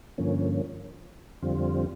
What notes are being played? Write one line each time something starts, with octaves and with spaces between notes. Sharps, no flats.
G2 D3 F3 A#3 C#4
F2 D3 G3 C4 F4